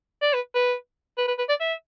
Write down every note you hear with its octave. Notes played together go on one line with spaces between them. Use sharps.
D5
B4
B4
B4
B4
B4
D5
E5